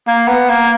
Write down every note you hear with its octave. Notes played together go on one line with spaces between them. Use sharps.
A#3
B3
A#3